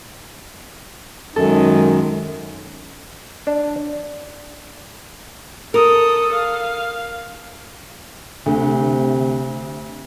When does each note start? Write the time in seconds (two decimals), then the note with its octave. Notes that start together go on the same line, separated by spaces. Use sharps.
1.36 F#2 D#3 G#3 A4
3.47 D4
5.74 A4 A#4 D#6
6.33 F5
8.46 D2 C3